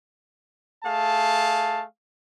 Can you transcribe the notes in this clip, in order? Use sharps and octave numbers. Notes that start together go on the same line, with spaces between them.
A3 G#4 F5 A5